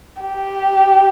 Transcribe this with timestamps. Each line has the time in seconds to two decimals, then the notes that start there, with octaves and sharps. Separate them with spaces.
0.22 G4